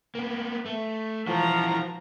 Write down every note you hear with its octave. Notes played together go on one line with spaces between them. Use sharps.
A#3 B3
A3
E3 F3 F#4 A#5